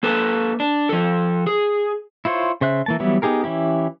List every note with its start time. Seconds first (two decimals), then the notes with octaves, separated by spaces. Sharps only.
0.03 A#3 A4 B4
0.60 D4
0.89 F3 A4
1.47 G#4
2.25 E4 F4 C5 C#5
2.61 C#3 C5 E5 F#6
2.86 E3 A#3 A5
3.00 E3 F#3 G3 B3 E4
3.22 B3 D#4 G4 G#4 A#4
3.44 E3 C#4 E4 G4